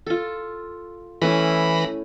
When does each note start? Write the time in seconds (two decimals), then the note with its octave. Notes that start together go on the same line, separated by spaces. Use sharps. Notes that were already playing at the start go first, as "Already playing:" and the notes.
0.07 F4 A4
1.21 E3 A3 C#4 E4 B5 A#6